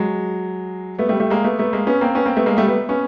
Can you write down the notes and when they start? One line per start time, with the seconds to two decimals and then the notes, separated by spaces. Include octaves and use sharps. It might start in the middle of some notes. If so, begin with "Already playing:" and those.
Already playing: F#3 G#3
0.99 A3 B3
1.09 G3 A3
1.19 G3 A3
1.30 G#3 A#3
1.44 A3 B3
1.59 A3 B3
1.73 G#3 A#3
1.87 B3 C#4
2.01 A#3 C4
2.15 B3 C#4
2.26 A#3 C4
2.36 A3 B3
2.46 G#3 A#3
2.57 G3 A3
2.67 A3 B3
2.89 B3 C#4